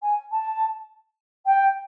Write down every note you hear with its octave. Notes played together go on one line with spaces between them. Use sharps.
G#5
A5
G5